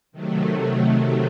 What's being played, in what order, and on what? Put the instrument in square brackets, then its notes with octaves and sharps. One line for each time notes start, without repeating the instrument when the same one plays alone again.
[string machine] C3 D#3 F#3 A3